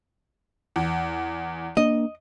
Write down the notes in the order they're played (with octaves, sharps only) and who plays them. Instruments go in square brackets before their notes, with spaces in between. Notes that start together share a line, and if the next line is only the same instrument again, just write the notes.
[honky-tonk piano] E2
[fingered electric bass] A#3 D4 [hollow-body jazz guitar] D#5